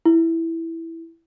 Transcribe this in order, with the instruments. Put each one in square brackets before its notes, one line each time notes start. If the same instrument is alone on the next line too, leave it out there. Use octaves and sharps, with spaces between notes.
[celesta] E4